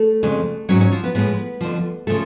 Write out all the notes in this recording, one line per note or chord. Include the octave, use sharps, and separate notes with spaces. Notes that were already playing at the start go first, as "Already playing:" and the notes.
Already playing: A3 A4
F2 C#3 G#3
G#2 F#3 C#4 C#5
C#4 C#5
F3 F4
B3 B4
A2 F3 G#3 B3 B4
F2 D3 F3
C#3 F3 A3 A4